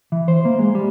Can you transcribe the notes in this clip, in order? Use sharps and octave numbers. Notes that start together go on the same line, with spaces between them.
E3
C5
A#3
G#3
G3